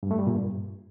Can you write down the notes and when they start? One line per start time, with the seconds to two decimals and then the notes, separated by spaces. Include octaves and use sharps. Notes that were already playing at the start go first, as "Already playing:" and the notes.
0.03 G2
0.11 A3
0.19 G3
0.27 A#2
0.35 G2